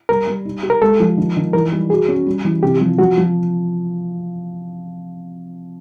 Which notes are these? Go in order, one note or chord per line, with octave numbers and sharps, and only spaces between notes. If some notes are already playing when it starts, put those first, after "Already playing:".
G3 A#4
G3
D#4
G4
A#4
G#3 A4
F3
D#3
D#3
E3 A#4
G3
F#4 G#4
C#4
G3
E3
C3 G4
F3
F3 F#4
F3